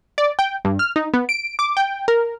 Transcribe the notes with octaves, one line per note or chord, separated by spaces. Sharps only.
D5
G5
G2
F6
D#4
B3
D7
D6
G5
A#4